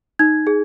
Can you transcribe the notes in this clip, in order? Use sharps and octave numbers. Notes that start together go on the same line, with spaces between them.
D#4 G#6
G#4